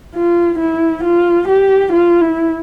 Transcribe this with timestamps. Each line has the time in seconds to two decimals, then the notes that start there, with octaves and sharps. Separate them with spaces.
0.15 F4
0.59 E4
1.03 F4
1.48 G4
1.92 F4
2.21 E4